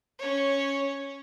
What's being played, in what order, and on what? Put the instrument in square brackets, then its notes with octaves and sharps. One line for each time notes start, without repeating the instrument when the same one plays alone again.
[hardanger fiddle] C#4 C#5